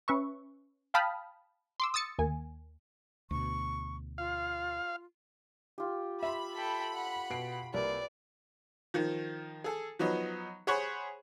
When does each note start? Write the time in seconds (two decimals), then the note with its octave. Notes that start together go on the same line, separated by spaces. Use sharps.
0.08 C#4 B4 E5 C#6
0.94 F5 G5 A5 B5 D#6 F6
1.80 C6 D6 E6
1.94 D#6 E6 A6 C#7
2.19 D#2 A#3 G#5
3.31 D2 B2 C#6
4.18 F4 F5
5.78 F4 G4
6.23 E5 B5 C6
6.55 A4 G5
6.95 F#5
7.30 B2 C7 D7
7.74 C2 A#3 B4 D5
8.94 D#3 F3
9.64 G#4 A4
9.99 F3 F#3 B3 D#4
10.67 G#4 C5 C#5 F#5 B5 C#6